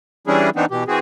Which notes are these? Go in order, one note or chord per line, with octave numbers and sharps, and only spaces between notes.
E3 G3 C#4 D4 E4 G#4
E3 B3 C4 D4 D#4
B2 E3 G4
E3 C4 F#4 G#4